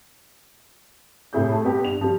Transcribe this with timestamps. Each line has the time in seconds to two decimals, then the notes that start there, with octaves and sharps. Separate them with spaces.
1.33 A2 C3 E4 G#4 G6
1.52 A3
1.64 B2 G3 B3 C4 G4
1.85 G2 F7
2.01 F3 G3